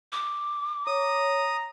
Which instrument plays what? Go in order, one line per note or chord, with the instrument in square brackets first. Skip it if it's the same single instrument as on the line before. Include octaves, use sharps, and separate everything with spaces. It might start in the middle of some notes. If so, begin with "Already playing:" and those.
[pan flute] D6
[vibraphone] C#5 [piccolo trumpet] A#5 [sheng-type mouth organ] D#6